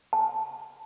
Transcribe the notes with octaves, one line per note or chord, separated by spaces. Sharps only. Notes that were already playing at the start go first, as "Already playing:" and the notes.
A5